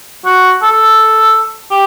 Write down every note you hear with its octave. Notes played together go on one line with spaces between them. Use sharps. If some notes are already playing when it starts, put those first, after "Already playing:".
F#4
A4
G4